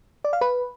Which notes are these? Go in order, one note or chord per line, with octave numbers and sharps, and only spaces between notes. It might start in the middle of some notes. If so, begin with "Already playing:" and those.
D5
F5
B4